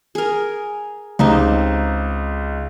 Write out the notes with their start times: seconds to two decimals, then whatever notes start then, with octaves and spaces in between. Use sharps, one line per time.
0.15 G#4 A#4
1.19 C#2 C4 D#4 G4